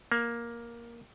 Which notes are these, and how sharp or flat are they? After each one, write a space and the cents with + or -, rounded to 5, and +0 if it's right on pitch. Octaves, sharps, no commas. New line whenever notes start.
A#3 +10